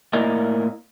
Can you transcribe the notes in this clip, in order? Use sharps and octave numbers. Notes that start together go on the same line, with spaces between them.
A2 A#3 E4 A#4 D5 D#5